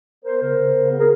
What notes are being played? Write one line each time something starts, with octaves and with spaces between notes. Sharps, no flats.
B3 A#4 C5
C#3 A#4 C5
C#3
C#3
B3
G#4 A#4